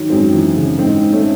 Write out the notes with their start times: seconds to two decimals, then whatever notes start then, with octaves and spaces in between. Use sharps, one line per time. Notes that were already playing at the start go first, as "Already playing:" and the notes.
Already playing: D#3 F#3
0.10 F#2 G#3 C4
0.33 E3
0.56 C#3
0.78 G#2 C4 D#4
1.02 G#2
1.12 A3 C#4